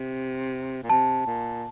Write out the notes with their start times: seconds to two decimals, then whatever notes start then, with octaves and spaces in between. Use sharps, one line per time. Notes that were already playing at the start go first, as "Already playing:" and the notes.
Already playing: C3
0.83 A#2
0.90 C3 A5
1.27 A#2